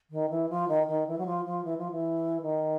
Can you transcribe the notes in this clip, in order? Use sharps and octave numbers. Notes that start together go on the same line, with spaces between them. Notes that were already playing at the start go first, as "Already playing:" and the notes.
D#3
E3
F3
D#3
D#3
E3
F#3
F3
F3
E3
F3
E3
D#3